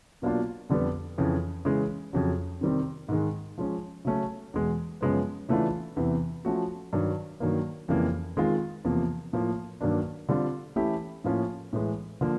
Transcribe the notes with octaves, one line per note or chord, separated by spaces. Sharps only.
B2 F#3 A#3 D4 F4
F2 D3 G3 B3
F2 C#3 E3
C#3 E3 G#3
F2 C#3 F#3
C3 D#3 G3 C4
G#2 D#3 G#3
F3 G#3 C#4
C#3 F#3 A3 C#4
E2 B2 G#3
F#2 C#3 F3 G#3 B3
C#3 E3 A3 D4 F4
E2 C3 E3
F3 A3 C#4 F#4
G2 D#3 F#3
G2 D#3 F#3 A#3
F2 C#3 E3 G3 A#3
D#3 G#3 C4 F4
E2 C3 F3 A#3
A2 F3 A#3
G2 D#3 F#3 A#3 D4
D3 G3 C4 F4
E3 A3 C#4 E4 G4
A2 F3 A#3 C#4 F4
A2 E3 G#3
D3 F3 A#3